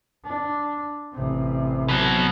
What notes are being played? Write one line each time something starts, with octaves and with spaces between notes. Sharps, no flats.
D4
A1 C3
B2 F#3